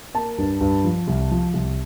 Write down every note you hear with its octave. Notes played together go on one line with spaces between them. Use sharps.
A#3 A5
G2
G2
F3
C2
F3
C2